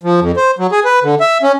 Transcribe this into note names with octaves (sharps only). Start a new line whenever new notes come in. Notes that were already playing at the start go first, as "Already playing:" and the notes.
F3
F2
C5
F#3
G#4
B4
D3
E5
C#4